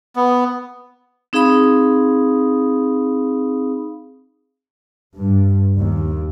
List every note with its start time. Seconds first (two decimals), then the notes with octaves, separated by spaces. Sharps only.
0.16 B3
1.33 C4 D#4 G#4 F5 B5 D#6
5.16 G2
5.76 D#2